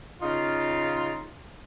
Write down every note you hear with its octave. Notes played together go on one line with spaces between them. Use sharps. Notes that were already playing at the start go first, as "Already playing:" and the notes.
C#3 D#4 F4